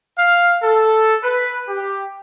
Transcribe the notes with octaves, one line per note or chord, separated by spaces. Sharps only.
F5
A4
B4
G4